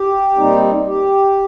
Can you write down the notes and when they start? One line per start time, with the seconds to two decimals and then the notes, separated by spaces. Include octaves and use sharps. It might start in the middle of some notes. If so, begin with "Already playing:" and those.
Already playing: G4
0.36 A#2 G3 C4 D#4
0.87 G4